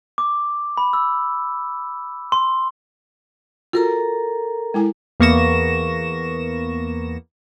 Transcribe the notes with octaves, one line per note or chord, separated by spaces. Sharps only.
D6
B5
E6
C6
F4 F#4 A4 A#4 A#5
G#3 E4 G#5
E2 A#3 B3 C#6 A#6 E7